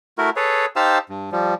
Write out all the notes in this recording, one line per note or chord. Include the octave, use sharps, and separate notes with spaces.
A3 E4 F#4 A#4
G#4 A4 B4 C#5
D#4 G4 C5 F5 A5 E6
G2
F3 G3